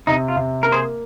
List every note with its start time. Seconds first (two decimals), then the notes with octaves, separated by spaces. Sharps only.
0.07 C3 D#4
0.28 F4
0.36 C3
0.63 A#3 A#4
0.72 G#4 C5